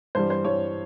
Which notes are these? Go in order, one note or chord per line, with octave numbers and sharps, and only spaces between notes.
G2 E3 G3 C5
C5
G2 E3 G3 C#5